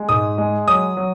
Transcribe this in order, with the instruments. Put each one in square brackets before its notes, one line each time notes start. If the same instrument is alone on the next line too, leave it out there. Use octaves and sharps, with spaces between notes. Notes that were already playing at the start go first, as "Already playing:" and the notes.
Already playing: [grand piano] G#3
G#2 D#6
G#3
F#3 D#6
F#3